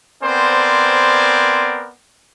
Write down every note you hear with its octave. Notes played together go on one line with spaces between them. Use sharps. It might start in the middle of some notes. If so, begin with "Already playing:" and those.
B3 C4 A#4 C5 D5 G#5